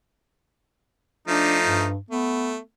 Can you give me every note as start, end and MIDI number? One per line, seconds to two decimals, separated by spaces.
1.28 1.88 53
1.28 1.88 57
1.28 1.57 62
1.28 1.88 63
1.63 1.97 43
2.11 2.57 57
2.11 2.59 59